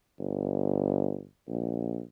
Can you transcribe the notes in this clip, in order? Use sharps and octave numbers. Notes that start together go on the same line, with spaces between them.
G1
A#1